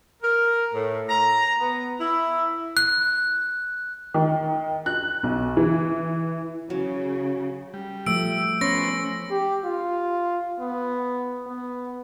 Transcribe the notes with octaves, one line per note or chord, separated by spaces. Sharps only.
A#4
A2
A#5
B3
E4
F#6
D#3
F#6
B1
E3
C#3 F#3
G3
F3 A3 E6 D7
B3 C#4 C5 C#5 A#6
G4
F4
B3
B3